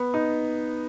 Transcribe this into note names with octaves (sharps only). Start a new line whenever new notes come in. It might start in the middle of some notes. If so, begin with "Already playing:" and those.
Already playing: B3
D#4